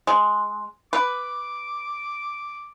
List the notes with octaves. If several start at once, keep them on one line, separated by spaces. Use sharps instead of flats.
G#3
B4 D6